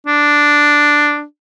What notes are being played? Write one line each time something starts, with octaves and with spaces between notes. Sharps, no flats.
D4